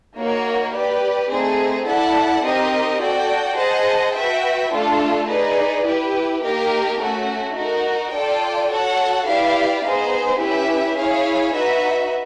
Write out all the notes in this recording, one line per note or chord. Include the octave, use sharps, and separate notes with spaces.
A#3 D#4 F#4 A#4 C#5
G4 B4 D5
A3 C4 D#4 G#4
E4 A4 D5 F#5 A5
C4 D#4 G4 A#4 D#5
F#4 A4 D5 G5
G#4 C5 D#5 F#5 A5
F#4 B4 E5 G5
A3 D4 F4 A4
D#4 G#4 B4 D5
E4 G4 B4
A#3 D#4 G4 A#4
A3 C#4 F#4
D#4 F#4 A#4
F4 A4 D5 G5
F#4 A4 C#5 F#5
E4 G4 B4 D5 F5
B3 D#4 G#4 C5
C#4 E4 G4 B4 E5
E4 G#4 C#5 F5
D#4 F#4 B4 E5